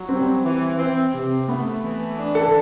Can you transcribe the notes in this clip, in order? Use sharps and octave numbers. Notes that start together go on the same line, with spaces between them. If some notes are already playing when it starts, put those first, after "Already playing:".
Already playing: F#3
G3 C4
E3
C4
C3
A3 B3
E3
D4
A4